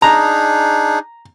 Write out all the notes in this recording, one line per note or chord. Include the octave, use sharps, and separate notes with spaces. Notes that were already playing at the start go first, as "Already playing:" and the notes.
D4 D#4 G#4 A#5